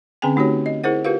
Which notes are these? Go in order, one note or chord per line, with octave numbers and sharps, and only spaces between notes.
D3 C4 C#4 G#4 G5 G#5
A3 D#4 F#4 G4 C#5
D#5
E4 G#4 A#4 C5 F#5
F4 G4 A#4 B4 F5